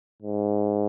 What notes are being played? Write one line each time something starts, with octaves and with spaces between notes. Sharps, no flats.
G#2